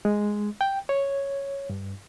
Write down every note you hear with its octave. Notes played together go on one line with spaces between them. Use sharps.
G#3
G5
C#5
G2